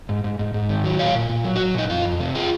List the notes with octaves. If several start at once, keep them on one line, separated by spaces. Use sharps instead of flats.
G#2
G#2
G#2
G#2
D#3
F#3
A#2 C#5 F5
A#2
A#2
F#3
D#4 F#4
F#3
A#2 D#4
F2 F4
F2
C3
F4 G#4